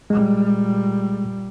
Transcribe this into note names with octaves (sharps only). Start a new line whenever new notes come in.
A#2 G3 G#3